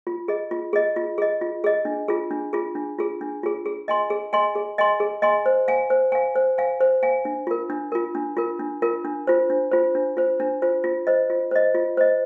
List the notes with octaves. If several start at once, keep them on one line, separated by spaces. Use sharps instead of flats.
F4
G#4 D#5
F4
G#4 D#5
F4
G#4 D#5
F4
G#4 D#5
D4
F4 G#4
D4
F4 G#4
D4
F4 G#4
D4
F4 G#4
G#4
D#5 G#5 C6
G#4
D#5 G#5 C6
G#4
D#5 G#5 C6
G#4
D#5 G#5 C6
C5
F5 G#5
C5
F5 G#5
C5
F5 G#5
C5
F5 G#5
D4
F4 A#4
D4
F4 A#4
D4
F4 A#4
D4
F4 A#4
D4
F4 C5
D4
F4 C5
D4
F4 C5
D4
F4 C5
F4
C5 D#5
F4
C5 D#5
F4
C5 D#5